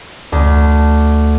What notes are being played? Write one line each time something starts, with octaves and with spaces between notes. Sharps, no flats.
D2